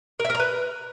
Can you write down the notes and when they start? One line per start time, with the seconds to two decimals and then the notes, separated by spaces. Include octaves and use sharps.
0.20 A#4
0.25 E5
0.30 A#4
0.35 A#5
0.40 B4